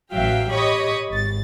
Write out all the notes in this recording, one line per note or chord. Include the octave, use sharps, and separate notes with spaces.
A1 F#3 E5 F5 G5
G4 C#5 D#5 B5 C#6 D#6
G#1 A6